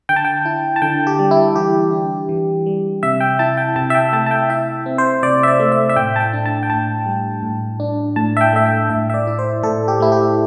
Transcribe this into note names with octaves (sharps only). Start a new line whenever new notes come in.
D3 G5
A5
G5
E4
A5
D3 G5
G4
G3
E4
E3 G4
D4
E3
G3
C3 E5
G5
E4 A5
G5
C3 A5
E5
G5
A3 A5
A5
G5
E4 E5
C4
C5
C3 D5
E5
D5
A3
E5
E5
A2 G5
A5
G5
D4
A5
G5
A2 A5
G3
A2
D4
A2 A5
E5
G5
A3 E5
G5
A2 E5
E5
D5
E4
C5
A2 A4
G4
A3 E4
G4